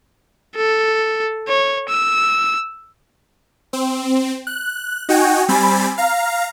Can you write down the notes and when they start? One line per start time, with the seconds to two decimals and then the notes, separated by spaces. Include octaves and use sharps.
0.56 A4
1.48 C#5
1.89 E6
3.73 C4
4.47 F#6
5.09 D#4 F#4 G5 G#5
5.48 G3 C4 G#5 B5 A6
5.98 F5 A#5